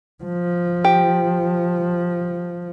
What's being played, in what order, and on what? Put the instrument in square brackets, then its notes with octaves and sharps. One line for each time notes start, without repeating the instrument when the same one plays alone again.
[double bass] F3
[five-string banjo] G4